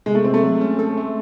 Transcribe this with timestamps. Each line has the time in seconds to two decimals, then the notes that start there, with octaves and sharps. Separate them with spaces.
0.06 C3 G#3
0.15 A3
0.24 C3 C4
0.34 A3
0.43 F#3
0.61 C#4
0.79 A4
0.97 A3